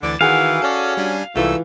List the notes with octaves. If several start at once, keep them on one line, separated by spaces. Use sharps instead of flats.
D2 D3 E3 D5 A6
D#3 E3 F#4 G#4 F5 F#5
C#4 A4 D5
G3 D4 G#5
C2 G#2 D3 E3 A3 F4 E6